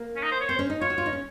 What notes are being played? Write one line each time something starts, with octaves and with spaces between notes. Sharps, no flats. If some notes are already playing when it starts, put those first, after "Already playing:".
Already playing: A#3
C#4
D#4
C5
C#5
C4 C5
C#4
D#4
F4 C#5
F#4
F4
D#4
C#4